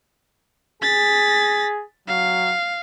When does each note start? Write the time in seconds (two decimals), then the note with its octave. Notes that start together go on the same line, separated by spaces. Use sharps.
0.83 G#4 A6 B6
2.08 F#3 F5